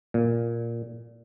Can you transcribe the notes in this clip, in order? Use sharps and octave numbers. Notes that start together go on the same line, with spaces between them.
A#2